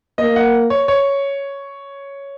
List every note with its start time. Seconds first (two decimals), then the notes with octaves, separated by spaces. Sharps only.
0.18 A#3 D#5
0.36 F#5
0.70 C#5
0.88 C#5